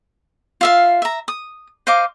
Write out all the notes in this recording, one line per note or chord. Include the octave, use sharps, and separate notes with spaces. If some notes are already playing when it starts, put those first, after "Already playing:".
F4 E5 F5
E5 A#5
D#6
C5 D#5 F5 D6